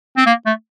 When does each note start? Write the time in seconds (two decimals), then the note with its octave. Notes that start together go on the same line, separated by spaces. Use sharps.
0.17 C4
0.26 A#3
0.46 A3